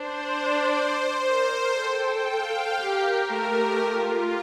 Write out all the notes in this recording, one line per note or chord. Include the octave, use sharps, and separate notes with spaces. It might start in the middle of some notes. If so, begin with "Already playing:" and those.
Already playing: D4 C5
D5
C5
A#4 C5
A4 G5
F5
G4 A#4
A3 G4
F4